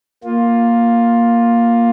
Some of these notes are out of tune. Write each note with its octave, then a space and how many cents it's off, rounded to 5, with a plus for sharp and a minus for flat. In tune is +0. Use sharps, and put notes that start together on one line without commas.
A#3 +0 F4 +10